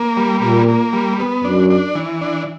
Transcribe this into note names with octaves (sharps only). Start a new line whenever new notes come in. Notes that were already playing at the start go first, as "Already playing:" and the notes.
Already playing: A#3
G3
A#2 A#3
A#3
G3
B3
F#2 D4
D4
E3
D4